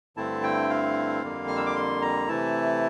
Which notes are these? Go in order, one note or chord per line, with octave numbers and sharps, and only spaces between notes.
G2 D3 A3 C4 E4 A5
G5
F5
F2 D3 G3 A#3
F6
E6
D6
C6
A#5
C3 E3 A3 E4 A5